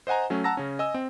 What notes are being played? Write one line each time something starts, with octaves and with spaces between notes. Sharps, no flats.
C5 D#5 F#5 G#5 A#5
F#3 A3 C#4
F#5 A5 A#5 E6 A#6
C#3 C#4
D#5 G#5 E6
C4